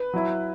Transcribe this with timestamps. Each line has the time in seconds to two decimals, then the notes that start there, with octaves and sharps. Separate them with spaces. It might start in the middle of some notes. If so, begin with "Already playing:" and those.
Already playing: B4
0.14 F#3 E4